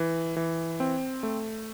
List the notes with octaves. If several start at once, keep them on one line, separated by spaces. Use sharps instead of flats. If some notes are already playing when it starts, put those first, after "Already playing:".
Already playing: E3
E3
C4
A3